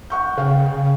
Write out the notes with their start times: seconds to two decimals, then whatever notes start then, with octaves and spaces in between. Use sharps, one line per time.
0.10 F#5 C#6 G6
0.38 C#3 F5 G5